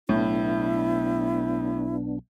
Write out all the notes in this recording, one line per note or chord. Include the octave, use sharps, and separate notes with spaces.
B1 A2 B3 D4 E4